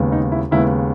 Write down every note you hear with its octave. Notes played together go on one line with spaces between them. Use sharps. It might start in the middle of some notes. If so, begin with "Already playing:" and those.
Already playing: D#2 C#3 G#3 B3
D#4
E4
D#2 C#3 G#3 B3 E4